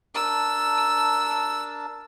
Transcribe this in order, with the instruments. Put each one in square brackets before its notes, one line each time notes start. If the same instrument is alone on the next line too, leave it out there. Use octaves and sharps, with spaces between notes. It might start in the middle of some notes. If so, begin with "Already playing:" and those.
[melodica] D4 A#4 A5 [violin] E6